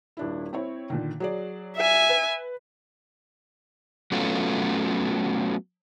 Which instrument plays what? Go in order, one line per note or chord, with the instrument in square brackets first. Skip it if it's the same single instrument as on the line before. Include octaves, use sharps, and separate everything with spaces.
[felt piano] D#1 D4 E4
C4 E4 C#5
A#2 D3 D#3
F#3 G#4 D5
[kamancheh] E5 G#5
[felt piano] B4
[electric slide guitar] F#3 A3 B3 C#4 F4